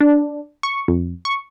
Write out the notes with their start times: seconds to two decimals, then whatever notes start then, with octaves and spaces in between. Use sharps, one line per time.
0.01 D4
0.63 C#6
0.88 F2
1.25 C#6